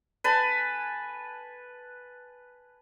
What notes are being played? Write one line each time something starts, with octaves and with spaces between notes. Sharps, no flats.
B4 G#5 A5